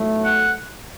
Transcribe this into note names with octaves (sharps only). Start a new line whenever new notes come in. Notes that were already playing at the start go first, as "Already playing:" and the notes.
Already playing: B1 A2 F#3 A3
F#5